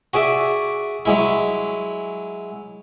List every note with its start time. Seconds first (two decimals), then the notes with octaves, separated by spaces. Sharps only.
0.14 F#4 G#4 D5 E5
1.05 F#3 G#3 E4